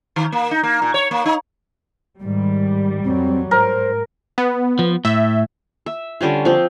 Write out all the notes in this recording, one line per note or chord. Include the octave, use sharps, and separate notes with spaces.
D#3
A#3
D#4
A#3
A#2
C#5
A#3
D#4
G#2 D#3 G3
F2 F#3 C4
G#2 A#4 C5
B3
F3
A2 E5
E5
D3 G3 C#4 F4
F3 C4